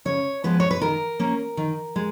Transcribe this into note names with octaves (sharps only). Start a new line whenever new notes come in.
C#3 C#5
F3 G#3 B3 B4
C#5
B4
D#3 A#4
A#3 C#4
D#3
G#3